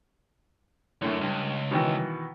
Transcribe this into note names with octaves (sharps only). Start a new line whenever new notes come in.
F#2 D3 A3 E4
C#2 G2
B2 D#3 E3